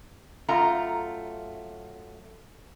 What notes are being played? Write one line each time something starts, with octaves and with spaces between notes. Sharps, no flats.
F#2 A3 F4 A#5